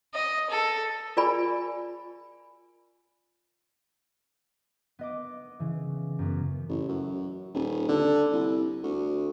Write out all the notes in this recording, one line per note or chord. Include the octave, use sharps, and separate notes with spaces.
D#5
A4
F4 G#4 A#4 D5 G#5 B5
B3 D#5 D6
C#3 E3
F#2 B3
A1
F#2
D#1
D3
C2
D2